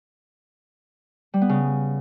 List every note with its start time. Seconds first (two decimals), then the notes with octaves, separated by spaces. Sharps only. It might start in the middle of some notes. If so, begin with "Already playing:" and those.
1.34 G3
1.41 B3
1.49 C#3